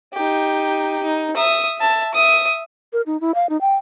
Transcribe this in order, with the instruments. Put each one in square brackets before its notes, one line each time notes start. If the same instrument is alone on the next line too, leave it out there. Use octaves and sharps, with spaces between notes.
[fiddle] D#4 G4
D#4
E5 D#6
E5 A5
E5 D#6
[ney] A#4
D#4
E4
F5
D#4
G5